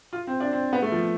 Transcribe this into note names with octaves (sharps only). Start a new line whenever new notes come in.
F4
C4
D4
C4
B3
A3
F3